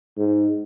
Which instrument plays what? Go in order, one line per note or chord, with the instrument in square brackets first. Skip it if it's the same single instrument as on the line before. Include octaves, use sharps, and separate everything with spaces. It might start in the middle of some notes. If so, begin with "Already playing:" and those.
[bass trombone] G#2